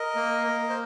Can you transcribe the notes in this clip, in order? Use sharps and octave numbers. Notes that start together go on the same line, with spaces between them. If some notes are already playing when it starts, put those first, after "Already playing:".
Already playing: A#4 D#5
A#3
A#3
C5